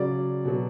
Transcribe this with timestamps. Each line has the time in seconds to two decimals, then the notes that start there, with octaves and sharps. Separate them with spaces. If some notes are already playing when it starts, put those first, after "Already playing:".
Already playing: C#3 F#3 D5
0.45 B2 F#3